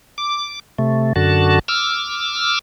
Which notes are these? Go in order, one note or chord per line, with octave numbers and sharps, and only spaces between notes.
D6
C3 A3
F#2 D3 F#4 A5
D6 E6 F6